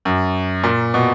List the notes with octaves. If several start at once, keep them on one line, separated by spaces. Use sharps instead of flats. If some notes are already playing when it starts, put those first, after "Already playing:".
F#2
A#2
B2